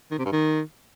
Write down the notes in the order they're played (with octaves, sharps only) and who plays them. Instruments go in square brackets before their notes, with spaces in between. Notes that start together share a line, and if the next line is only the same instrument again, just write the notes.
[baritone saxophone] D#3
C3
G2
D#3